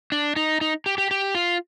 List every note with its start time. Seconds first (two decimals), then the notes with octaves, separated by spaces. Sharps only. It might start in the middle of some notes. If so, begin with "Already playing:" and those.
0.12 D4
0.36 D#4
0.61 D#4
0.86 G4
0.98 G4
1.11 G4
1.35 F4